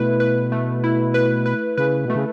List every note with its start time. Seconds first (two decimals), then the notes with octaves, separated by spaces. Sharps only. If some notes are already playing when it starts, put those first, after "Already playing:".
Already playing: B2 A3 E4 B4
0.20 B4
0.52 A3
0.84 E4
1.14 B4
1.46 B4
1.77 C#3 B4
2.05 B2 A3
2.15 C#3